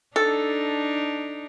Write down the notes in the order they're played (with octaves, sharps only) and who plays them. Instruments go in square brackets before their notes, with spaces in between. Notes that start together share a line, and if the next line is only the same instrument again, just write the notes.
[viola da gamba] D4 D#4 [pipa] A4